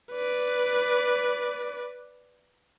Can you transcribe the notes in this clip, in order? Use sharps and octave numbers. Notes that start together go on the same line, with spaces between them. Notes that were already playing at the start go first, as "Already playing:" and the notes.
B4 D5